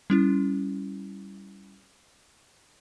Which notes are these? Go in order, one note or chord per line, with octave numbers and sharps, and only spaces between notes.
G3 C#4 E4